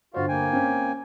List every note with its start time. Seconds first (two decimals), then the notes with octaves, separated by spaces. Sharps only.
0.14 G1 F4 F#4 C5 F5
0.29 A#3 G5 G#5
0.53 C4 C#4